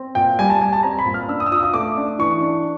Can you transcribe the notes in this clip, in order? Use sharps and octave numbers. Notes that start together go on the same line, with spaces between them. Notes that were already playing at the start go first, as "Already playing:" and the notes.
Already playing: C4
A#2 G5
G3 G#5
A5
G3 G#5
A5
C4 A#5
B5
A#2
F6
D4 E6
D#6
E6
F4 D#6
D#6
A3 D6
D4
E3 C#6
D4